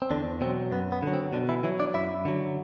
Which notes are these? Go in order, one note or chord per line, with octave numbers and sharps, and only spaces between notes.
C4
E2 D3 D4
B2 F#3 C4
F#2 B3
B3
D3 F#3
C4
B2 D3 D4
E3 E4
E3 F#3 E4
D4 D5
F#2 E4 E5
D3 F#3